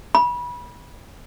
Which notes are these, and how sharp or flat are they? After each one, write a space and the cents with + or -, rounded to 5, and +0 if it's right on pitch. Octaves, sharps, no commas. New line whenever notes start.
B5 -25